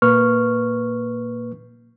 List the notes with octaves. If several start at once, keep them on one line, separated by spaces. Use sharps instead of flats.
A#2 A#3 B4 C#6 F6